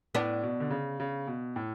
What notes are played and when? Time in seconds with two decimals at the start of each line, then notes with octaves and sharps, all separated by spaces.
0.15 A2 B3 D4
0.43 B2
0.60 D3
0.70 C#3
1.00 C#3
1.28 B2
1.56 A2